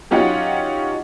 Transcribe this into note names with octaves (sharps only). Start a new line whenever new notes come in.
F#3 C#4 D#4 F4 G4 F#5